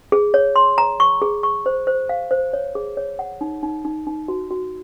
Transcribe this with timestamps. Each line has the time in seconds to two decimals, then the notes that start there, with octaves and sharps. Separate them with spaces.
0.12 G#4
0.34 C#5
0.56 C6
0.78 A#5
1.00 C#6
1.22 G#4
1.43 C#6
1.66 C5
1.87 C5
2.09 F5
2.31 C5
2.53 C#5
2.75 G#4
2.97 C#5
3.19 F#5
3.41 D#4
3.63 D#4
3.85 D#4
4.07 D#4
4.28 F#4
4.51 F#4